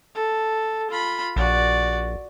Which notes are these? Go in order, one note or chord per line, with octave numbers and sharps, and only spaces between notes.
A4
F4 B5
A#1 F#4 D5